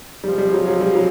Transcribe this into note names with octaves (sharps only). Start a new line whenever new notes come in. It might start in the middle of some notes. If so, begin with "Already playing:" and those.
C3 F3 G3 G#3
G3
F#3
F#3
G3
F#3